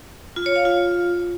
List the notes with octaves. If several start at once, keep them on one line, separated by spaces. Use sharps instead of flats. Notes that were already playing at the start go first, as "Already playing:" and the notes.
F4
C#5
F5
F4